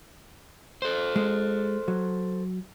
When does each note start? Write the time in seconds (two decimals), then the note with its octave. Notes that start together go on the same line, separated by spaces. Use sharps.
0.82 A4 C5
1.16 G#3
1.88 F#3